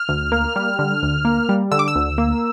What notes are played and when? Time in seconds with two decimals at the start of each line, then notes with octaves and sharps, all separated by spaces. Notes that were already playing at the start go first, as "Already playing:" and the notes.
Already playing: F6
0.09 D2
0.32 A#3
0.56 G3
0.79 D3
1.03 D2
1.25 A#3
1.49 G3
1.72 D3 E6
1.79 D6
1.88 E6
1.96 D2
2.18 A#3